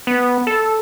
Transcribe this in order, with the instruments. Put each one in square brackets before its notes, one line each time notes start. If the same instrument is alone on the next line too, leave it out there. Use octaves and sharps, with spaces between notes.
[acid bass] B3
A4